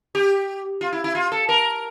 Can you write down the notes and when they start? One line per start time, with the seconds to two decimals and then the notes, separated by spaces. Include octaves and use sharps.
0.15 G4
0.81 F4
0.93 E4
1.04 E4
1.15 F4
1.32 A4
1.49 A#4